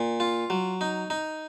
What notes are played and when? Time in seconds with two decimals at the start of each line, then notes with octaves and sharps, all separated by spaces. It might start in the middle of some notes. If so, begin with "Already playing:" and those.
Already playing: A#2
0.20 F4
0.50 F#3
0.81 D#4
1.10 D#4